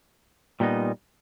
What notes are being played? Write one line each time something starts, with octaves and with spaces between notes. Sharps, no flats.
A#2 G3 B3 D#4